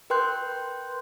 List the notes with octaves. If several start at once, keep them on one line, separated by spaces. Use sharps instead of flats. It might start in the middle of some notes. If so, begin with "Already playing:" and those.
A#4 B4 G5 C6 F#6 G6